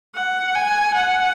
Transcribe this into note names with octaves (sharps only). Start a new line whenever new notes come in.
F#5
G#5
F#5